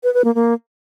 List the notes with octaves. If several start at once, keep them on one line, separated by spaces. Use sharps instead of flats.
B4
B4
A#3
A#3